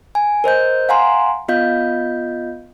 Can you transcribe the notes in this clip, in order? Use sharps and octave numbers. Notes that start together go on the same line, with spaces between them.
G#5
A#4 C5 D#5 G6
F5 F#5 G#5 A#5 C6
B3 F4 D#5 F5 G6